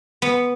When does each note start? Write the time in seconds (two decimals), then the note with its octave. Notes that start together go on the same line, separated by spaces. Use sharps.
0.22 B3